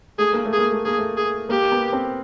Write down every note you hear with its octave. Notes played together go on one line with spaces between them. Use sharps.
A3 G#4
A#3
A3
G#4
A#3
A3
A#3 G#4
A3
G#4
A#3 G4
B3
C4